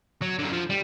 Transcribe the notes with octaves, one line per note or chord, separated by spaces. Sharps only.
F#3
F#2 D3
F3
G3